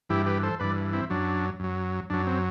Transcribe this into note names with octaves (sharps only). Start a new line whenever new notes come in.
G2 E3 E4 G4
G4 B4
A4 C5
G2 E3 B4 D5
C4 E4
F#2 F#3 D4
F#2 F#3
F#2 F#3 D4
C4